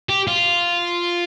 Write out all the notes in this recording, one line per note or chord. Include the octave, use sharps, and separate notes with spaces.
G4
F4